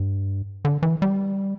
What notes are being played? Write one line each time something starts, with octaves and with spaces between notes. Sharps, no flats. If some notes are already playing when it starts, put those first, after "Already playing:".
Already playing: G2
D3
E3
G3